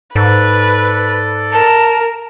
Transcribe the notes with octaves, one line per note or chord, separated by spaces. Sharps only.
G#2 A4 B4 D5
A#4 A5